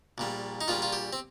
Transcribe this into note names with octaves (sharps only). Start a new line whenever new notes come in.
A#1 A#2 G3
D#4
A#1 A#2 G3 F4
F4
G4
C4